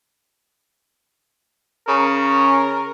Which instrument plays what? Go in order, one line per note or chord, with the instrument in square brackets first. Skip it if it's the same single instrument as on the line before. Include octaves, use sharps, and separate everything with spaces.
[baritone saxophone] C#3 [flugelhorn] A#4